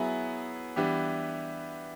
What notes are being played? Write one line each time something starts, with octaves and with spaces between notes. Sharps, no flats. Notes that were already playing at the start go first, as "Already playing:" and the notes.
Already playing: F#3 B3 E4 G#4
E3 G3 B3 D4 G4